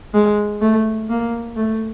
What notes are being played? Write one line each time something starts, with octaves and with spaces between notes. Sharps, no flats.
G#3
A3
A#3
A3